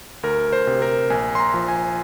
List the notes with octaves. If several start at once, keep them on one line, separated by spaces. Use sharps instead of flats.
D2 A#4
C5
C3
A#4
A#1 G#5
C6
A#5
F3
G#5